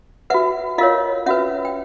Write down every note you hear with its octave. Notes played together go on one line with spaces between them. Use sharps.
F#4 B4 E5 F#5
F4 A#4 C#5 D#5 F5
C#4 F#4 B4 E5 F#5
G5